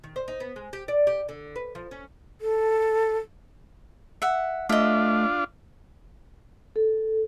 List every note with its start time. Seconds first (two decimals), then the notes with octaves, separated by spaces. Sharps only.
0.04 D#3
0.16 C5
0.28 D#4
0.40 B3
0.56 G#3
0.73 G4
0.88 D5
1.07 G4
1.29 D3
1.56 B4
1.75 F3
1.91 C#4
2.41 A4
4.22 E5 F#5
4.69 A3 D4 F4 D#5 E5
6.76 A4